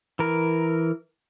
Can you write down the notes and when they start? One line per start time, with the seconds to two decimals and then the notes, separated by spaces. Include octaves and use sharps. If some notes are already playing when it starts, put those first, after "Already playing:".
0.19 E3 A#4